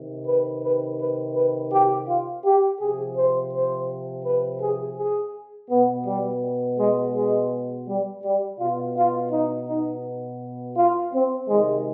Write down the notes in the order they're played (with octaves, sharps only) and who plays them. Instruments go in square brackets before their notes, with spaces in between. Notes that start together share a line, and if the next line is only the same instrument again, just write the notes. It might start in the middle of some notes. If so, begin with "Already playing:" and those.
Already playing: [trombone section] C3 D#3
B4
B4
B4
B4
G4
F4
G4
C3 F3 G#4
C5
C5
B4
G#4
G#4
B2 B3
G3
G#3
G#3
G3
G3
B2 F4
F4
D#4
D#4
F4
C4
C3 D#3 G#3